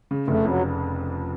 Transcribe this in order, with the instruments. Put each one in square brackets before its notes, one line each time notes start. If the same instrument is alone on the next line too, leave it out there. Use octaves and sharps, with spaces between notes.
[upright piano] C#3
[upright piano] F1 [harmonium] A3
[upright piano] F2 [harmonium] F#3